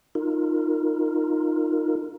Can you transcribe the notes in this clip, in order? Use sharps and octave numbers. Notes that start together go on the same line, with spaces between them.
D#4 F4 A#4